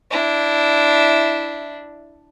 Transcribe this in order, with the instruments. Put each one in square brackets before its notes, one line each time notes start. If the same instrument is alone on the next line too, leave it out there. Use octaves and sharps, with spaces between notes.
[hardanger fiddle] D4 E4